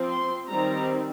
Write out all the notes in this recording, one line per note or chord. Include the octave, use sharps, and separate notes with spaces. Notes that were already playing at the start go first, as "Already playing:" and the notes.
Already playing: F3 C4
C6
D#3 G3 C4 A#5